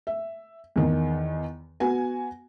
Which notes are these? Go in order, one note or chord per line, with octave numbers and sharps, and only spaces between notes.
E5
E2 D#3
B3 F#4 G#5